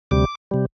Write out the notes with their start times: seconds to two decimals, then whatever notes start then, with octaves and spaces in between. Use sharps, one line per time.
0.11 D2 C3 G3 D6
0.51 C3 G3